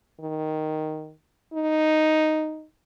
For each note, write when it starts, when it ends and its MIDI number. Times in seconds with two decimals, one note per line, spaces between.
0.21 1.13 51
1.54 2.66 63